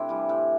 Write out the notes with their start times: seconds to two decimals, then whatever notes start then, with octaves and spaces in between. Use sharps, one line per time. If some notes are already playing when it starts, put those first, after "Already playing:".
Already playing: C3 A3 C4 D4 E4
0.09 E3 G3
0.29 A2